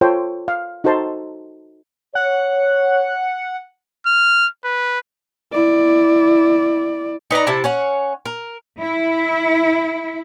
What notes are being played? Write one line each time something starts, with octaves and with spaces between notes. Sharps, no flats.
F4 A4 C5 C#5 G5
F5
D#4 F#4 A4 C5 A5 C6
C#5 F#5
F6
B4
E4 D5
D#4 B4 D5 A#5
C3 E4 A5
C#4 C#5 F#5
A#4
E4